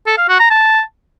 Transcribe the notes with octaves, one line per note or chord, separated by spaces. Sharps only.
A4
F5
F#4
A#5
A5